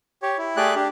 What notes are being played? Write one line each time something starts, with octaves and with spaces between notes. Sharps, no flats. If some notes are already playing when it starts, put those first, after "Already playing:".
G4 C#5
E4
A3 G4 G#4 D5 F#6
D4 G4